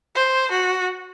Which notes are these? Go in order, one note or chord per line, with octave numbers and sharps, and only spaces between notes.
C5
F#4